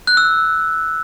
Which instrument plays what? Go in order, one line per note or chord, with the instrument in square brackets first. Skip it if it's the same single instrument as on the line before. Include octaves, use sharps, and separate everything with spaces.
[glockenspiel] F#6
E6